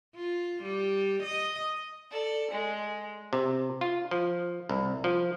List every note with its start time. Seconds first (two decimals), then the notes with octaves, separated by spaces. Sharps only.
0.16 F4
0.63 G3
1.23 D#5
2.11 A4 D5
2.51 G#3
3.33 C3
3.81 F4
4.11 F3
4.69 C2
5.04 F3